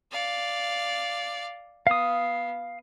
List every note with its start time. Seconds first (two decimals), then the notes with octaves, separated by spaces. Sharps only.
0.12 D5 F5
1.87 B3 F5 D#6